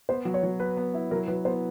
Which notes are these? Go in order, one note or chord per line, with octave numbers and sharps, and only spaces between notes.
B3 C5
F#3
C#5
F#3
B3 B4
B3
E4
F#3 A#4
F#3 B4
B3 C5